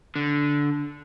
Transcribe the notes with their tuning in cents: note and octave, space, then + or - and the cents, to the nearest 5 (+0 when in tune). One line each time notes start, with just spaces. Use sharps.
D3 -10